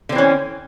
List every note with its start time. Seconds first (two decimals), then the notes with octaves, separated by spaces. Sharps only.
0.09 D3
0.12 C4
0.15 E3
0.18 C#4